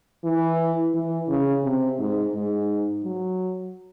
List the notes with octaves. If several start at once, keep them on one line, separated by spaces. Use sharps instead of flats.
E3
E3
C#3
C3
G#2
G#2
F#3